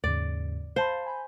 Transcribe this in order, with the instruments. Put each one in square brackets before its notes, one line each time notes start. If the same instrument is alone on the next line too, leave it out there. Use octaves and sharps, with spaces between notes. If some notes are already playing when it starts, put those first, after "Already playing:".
[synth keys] D#2 G#2 C#3 [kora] D5
[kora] C5 [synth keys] F5 A5 B5
[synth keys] G#5 B5 G6